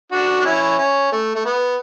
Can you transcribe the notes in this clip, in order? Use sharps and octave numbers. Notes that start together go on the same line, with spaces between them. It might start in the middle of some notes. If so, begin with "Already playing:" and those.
D4 F#4
D4
C#4 E4
C#4
A3
A3
B3